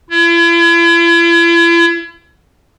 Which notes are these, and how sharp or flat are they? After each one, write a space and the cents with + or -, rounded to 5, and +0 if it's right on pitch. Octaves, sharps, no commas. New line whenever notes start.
E4 +45